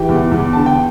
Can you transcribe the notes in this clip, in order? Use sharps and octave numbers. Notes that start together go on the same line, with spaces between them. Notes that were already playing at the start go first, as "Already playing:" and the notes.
Already playing: E3 G4 G5
E2
E2
D3 A5
G5